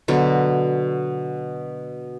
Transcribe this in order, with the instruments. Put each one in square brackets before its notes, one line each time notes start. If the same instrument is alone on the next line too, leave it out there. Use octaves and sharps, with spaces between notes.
[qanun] B2 D3 F#3